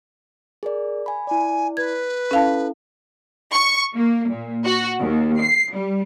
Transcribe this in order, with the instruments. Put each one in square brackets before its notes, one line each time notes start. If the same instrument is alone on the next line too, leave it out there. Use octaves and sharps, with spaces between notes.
[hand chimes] G#4 A#4 D5
G#5 B5
[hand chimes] E4 D5 [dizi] G#5
[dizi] B4 [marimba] G#6
[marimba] C#4 F5 A5 [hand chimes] E4 A4
[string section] C#6
A#3
A#2
F#4
D#2
C7
G3